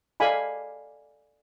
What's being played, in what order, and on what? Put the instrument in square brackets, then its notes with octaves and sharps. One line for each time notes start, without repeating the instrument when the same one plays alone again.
[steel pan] A4 D5 D#5 F5 G#5 B5